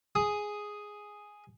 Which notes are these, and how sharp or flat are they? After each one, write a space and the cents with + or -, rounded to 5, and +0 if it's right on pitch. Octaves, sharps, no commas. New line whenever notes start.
G#4 +0 D#6 +0